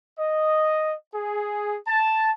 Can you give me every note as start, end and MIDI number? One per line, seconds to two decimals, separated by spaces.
0.19 0.93 75
1.13 1.76 68
1.87 2.30 81